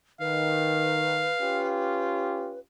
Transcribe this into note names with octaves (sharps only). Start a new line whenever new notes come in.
D#3 B4 F5
C#4 F4 G4